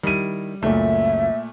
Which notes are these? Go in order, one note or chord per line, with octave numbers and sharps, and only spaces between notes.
D#3 G3 E4 D#7
C#2 F#2 A#2 A3 E5